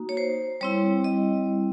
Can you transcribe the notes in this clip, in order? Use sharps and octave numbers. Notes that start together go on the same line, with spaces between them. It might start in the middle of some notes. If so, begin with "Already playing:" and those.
Already playing: A#3 D#4 F#4
C#5
C5
G3 C4 E4 C#5
D#5